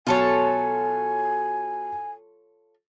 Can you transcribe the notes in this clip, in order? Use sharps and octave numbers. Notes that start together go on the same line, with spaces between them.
B2 F#3 F4 A4 C#5 G#5